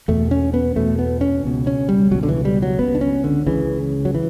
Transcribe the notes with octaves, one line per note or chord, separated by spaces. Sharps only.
E2 B2 A3
C#4
B3
E2 B2 A3
B3
C#4
C#2 B2
C#4
G3
C#2 B2 F#3
D3
E3
G3
F#3
C#2 C#3 B3
D4
C#4
D3
C#2 C#3 E3
F#3
E3